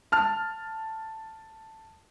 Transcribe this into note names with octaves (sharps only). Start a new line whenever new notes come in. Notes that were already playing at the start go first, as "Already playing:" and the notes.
A5 F6